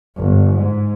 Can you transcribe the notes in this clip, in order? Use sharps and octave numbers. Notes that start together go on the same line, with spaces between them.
G1
G#2